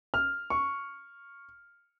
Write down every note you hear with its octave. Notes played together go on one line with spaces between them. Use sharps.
F6
C#6